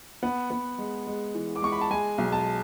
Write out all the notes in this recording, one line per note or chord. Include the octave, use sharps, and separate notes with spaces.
B3 F#5
B3
G#3
G#3
E3
D6
G#3 C#6
B5
A5
G#3 G#5
B1
A5